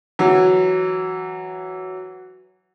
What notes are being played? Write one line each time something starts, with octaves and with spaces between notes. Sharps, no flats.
E3 F#3